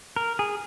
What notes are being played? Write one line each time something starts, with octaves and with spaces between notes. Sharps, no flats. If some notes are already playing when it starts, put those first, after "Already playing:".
A#4
G#4